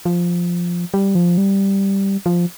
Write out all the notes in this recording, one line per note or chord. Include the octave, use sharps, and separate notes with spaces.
F3
G3
F3
G3
F3